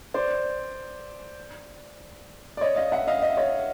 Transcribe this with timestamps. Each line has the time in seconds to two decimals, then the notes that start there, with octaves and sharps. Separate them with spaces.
0.14 C5 D5
2.57 D5
2.61 C#5 D#5
2.76 D#5 F5
2.92 E5 F#5
3.07 D#5 F5
3.22 D#5
3.30 E5
3.37 C#5 D#5